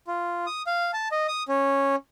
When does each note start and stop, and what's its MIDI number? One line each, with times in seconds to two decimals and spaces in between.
0.08 0.46 65
0.47 0.62 87
0.67 0.91 77
0.93 1.08 81
1.12 1.27 75
1.28 1.43 87
1.48 1.96 61